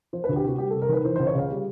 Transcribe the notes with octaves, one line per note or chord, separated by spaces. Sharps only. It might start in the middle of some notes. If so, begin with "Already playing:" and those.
F3 C5
B4
D2
G4
C3 F#4
G3 G4
A4
C3
A#4
D#3 B4
E3 C5
C5
C#2
C#5
C#3 F5
G3